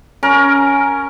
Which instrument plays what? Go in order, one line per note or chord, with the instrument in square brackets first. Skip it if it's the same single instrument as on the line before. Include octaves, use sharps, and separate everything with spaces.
[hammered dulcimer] C#4 A#4